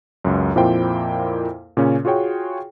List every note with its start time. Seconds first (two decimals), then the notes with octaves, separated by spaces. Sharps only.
0.25 C#2 F#2
0.56 F2 A#2 A#3 E4 C5 G5
1.77 A#2 C#3 C#4
2.05 F4 F#4 G#4 C#5 G5